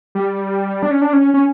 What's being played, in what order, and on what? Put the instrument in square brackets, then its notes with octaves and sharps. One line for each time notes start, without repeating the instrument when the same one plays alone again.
[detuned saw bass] G3
D4
C#4
D4
C#4
C#4